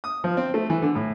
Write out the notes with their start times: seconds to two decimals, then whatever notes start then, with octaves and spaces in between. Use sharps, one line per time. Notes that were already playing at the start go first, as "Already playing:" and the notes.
0.04 D#6
0.24 F3
0.37 C4
0.54 A3
0.70 E3
0.82 D3
0.95 A2